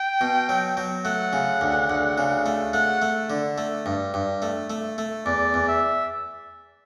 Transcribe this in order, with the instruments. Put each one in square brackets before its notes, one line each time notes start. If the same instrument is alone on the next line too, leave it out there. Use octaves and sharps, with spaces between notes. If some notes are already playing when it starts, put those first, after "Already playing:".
Already playing: [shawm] G5
[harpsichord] B2
F#3
F#3
[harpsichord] A3 [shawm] F#5
[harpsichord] C#3
D2
D2
C#3
A3
[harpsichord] A3 [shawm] F#5
[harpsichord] A3
D3
A3
G2
G2
A3
A3
A3
[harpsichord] E2 [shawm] D5
[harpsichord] E2
[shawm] E5